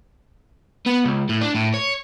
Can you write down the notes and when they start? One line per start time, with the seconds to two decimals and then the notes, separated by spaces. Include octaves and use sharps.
0.86 B3
1.04 C#2
1.29 A2
1.41 D4
1.55 A2
1.74 C#5